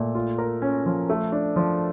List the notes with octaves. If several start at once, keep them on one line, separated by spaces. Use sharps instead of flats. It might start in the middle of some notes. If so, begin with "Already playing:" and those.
Already playing: A#2 A3
F4
A#4
C#4
F3
A3
D4
F3